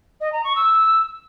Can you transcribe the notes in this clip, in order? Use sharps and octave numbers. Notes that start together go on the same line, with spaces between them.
D#5
A#5
C#6
E6